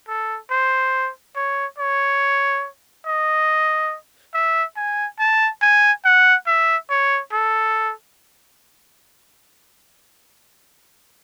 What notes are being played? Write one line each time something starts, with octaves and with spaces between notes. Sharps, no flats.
A4
C5
C#5
C#5
D#5
E5
G#5
A5
G#5
F#5
E5
C#5
A4